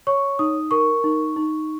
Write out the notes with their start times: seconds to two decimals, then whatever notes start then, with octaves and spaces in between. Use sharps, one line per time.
0.07 C#5 C#6
0.39 D#4 D#6
0.71 A#4 C#6
1.04 D#4
1.36 D#4